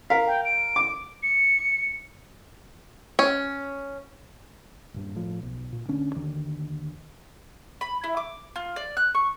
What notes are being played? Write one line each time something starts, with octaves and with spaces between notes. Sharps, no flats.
A#4 F5 B6
G5
D7
D6
C#7
C#4
D#1 G2
A2 F3
B1
A#2
D2 D3 C#4 D4
D#2 D3 D#3
B5
E4
D6
F4
D5
F#6
C#6